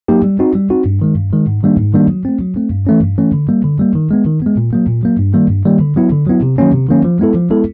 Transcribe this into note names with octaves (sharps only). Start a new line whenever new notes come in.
F#3 A#3 D#4 G4
G3
C4 D#4 F#4
G3
C4 D#4 F#4
G2
D#3 G#3
G2
D#3 G#3
G#2
D#3 G3 A#3 D4
G#2
D#3 G3 A#3 D4
F#3
A3 C4
F#3
A3 C4
G2
E3 A3 C#4
G2
E3 A3 C#4
D3
G3 A#3
D3
G3 A#3
D#3
G#3 B3
D#3
G#3 B3
A#2
F#3 A#3
A#2
F#3 A#3
G2
D#3 G3 A#3
G2
D#3 G3 A#3
D3
F#3 B3 E4
D3
F#3 B3 E4
C3
D#3 F#3 A#3 C#4
C3
D#3 F#3 A#3 C#4
F3
G#3 B3 E4 A4
F3
G#3 B3 E4 A4